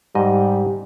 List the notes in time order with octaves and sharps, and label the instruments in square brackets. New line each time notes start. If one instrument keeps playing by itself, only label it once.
[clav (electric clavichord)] G#2 D#5 [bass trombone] G3